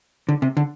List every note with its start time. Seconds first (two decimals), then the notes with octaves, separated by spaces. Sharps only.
0.29 D3
0.42 C3
0.57 D3